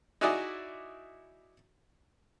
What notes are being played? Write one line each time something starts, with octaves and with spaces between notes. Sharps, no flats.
D#4 E4 F#4 G#4 D5 D#5